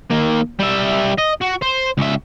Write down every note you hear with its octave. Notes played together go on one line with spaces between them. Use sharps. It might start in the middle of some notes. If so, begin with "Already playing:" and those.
D#3 A#3
G3 E5
D#5
F#4
C5
C#2 E5